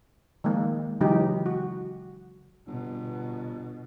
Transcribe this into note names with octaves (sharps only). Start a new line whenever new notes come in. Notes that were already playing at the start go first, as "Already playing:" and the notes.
D#3 F3 G#3 A#3
C#3 E3 F#3 G#3 D#4 G4
F#4
G1 B2